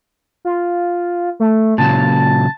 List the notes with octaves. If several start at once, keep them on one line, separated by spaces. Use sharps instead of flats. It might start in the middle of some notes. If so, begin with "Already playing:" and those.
F4
A3
A#2 C#3 F#3 A5